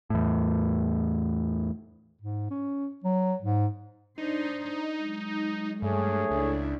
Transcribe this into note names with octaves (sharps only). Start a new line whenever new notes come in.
E2 A2
G#2
C#4
F#3
G#2
D4 D#4 C5
F#3 G#3
G2 A3 G#4 C#5
C#2 D4 E4